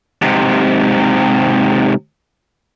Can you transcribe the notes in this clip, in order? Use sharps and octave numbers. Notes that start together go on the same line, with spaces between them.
G#2 C3